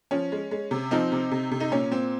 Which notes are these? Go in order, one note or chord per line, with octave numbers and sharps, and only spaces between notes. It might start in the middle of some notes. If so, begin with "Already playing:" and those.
F3 C#4
G#3
G#3
C3
F3 C4 D#4
C3
C3
C3
D#4
A#2 C#4
A#2 C4